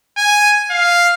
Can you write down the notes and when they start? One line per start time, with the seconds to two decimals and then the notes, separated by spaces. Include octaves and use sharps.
0.17 G#5
0.70 F5